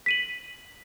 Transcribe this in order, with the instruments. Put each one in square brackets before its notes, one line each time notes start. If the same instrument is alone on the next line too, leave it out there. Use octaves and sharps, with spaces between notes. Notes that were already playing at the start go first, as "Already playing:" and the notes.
[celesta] B6 D#7 F#7